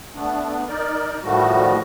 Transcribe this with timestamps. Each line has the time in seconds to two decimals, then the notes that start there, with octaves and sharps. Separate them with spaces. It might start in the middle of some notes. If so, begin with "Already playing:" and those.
0.15 A3 B3 D4
0.68 D#4 A#4 D5
1.23 A2 D#3 F3 G3 A3 F#4